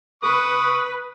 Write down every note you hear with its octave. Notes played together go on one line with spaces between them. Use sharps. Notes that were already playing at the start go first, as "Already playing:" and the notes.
B4 C#6 D#6